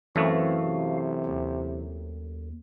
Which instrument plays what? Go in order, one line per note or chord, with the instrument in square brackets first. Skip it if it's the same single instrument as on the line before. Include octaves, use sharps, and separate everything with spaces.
[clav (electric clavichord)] F#2 A3 [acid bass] E3 [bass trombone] C4 [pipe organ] F#4 F5
[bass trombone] C3
[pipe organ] D#2